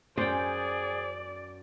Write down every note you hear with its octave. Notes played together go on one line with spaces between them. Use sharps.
F#2 G#4 C5 D5 G5